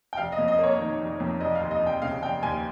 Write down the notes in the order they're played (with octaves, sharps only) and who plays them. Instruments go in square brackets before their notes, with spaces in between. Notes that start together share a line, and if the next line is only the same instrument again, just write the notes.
[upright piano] G5
F1 F5
D#5
F2
D#5
A#3 C#5
D#3
F1
F2
F1 D#5
F5
D#2
D#5
F1
G5
C#3 F5
F1 G5
D#2 G#5